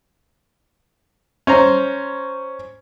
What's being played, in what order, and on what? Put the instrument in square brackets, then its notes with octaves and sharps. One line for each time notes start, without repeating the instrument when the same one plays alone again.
[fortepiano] C#4 C5 A#5